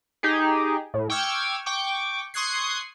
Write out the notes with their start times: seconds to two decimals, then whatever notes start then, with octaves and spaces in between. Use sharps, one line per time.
0.23 D#4 G4 G#4
0.94 A2
1.10 G5 C#6 D6 E6 F6 G#6
1.66 G5 C#6 D6
2.34 C6 C#6 D#6 F#6 G#6 C7